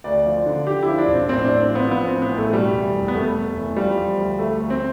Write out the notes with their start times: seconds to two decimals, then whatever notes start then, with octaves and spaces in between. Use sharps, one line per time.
0.04 D2 D5
0.26 F3
0.46 D3
0.67 D3 G4
0.83 E4
0.88 F3
0.98 D4
1.08 E1
1.14 C4
1.29 A1 C4
1.44 A1 D4
1.60 C4
1.70 F3
1.75 B3
1.90 F3 B3
2.07 A1 C4
2.22 B3
2.32 A1
2.38 A3
2.53 B2 G3
2.74 E2
2.94 F1
3.08 B3
3.14 F1 A3
3.35 F1
3.57 E2
3.76 F3 G3
3.97 F3
4.18 D2
4.38 D2 A3
4.60 D2
4.70 C4